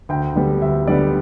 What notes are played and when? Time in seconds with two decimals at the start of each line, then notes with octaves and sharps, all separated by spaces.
0.09 D2 G5
0.36 D3 G3 B3
0.62 D2 E5
0.87 D3 G3 B3 D5